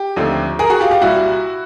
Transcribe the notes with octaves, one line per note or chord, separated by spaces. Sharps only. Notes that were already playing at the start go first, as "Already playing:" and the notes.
Already playing: G4
D#2 D3 F3 A3 C4
G#4 A#4
F#4 G#4
F4 G4
F4 G4
C2 A#2 G3 E4 F#4